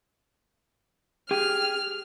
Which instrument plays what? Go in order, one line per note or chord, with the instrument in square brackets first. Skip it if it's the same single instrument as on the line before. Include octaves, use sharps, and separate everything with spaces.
[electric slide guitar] G4 G#4 G5 [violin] F6